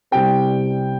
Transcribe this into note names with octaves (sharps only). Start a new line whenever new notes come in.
C2 C3 G3 C4 G5